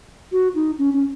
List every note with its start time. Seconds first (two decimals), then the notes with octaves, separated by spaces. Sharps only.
0.32 F#4
0.55 D#4
0.78 C#4
0.93 C#4